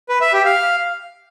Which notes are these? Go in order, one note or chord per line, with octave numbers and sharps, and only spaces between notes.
B4
E5
G4
F5